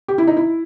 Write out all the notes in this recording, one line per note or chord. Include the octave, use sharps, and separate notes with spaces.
G4
E4
D#4
E4